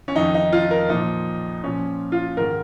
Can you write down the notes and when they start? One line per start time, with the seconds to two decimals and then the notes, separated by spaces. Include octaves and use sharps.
0.08 C#4
0.15 F2 D#3 D#4
0.34 D#4
0.53 F4
0.71 A#4
0.89 A#2 F3 D#4
1.63 A#2 F3 C#4
2.12 F4
2.37 G#2 D#3 A#4